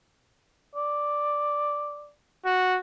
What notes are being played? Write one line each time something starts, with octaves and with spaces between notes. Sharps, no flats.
D5
F#4